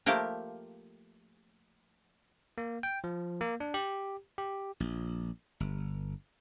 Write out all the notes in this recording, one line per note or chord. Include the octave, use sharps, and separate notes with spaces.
F3 A3 A#3 G4 A#4
A#3
G5
F3
A#3
D4
G4
G4
A#1
G1